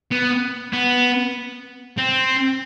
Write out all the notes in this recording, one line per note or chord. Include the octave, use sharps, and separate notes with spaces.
B3
B3
C4